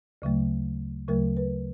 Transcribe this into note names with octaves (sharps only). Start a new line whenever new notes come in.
D2 C#3 F#3 A3
D2 C#3 F#3 A3 A#4
B4